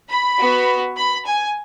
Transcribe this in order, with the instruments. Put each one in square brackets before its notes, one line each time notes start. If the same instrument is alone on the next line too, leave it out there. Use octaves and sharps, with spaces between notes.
[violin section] B5
B3 F#4
B5
G#5